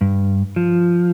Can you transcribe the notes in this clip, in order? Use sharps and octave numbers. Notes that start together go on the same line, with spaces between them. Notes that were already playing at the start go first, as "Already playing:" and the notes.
G2
F3